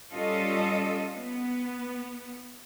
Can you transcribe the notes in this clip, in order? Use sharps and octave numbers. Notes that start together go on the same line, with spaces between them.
G3 C#4 F4 A4 D#5
B3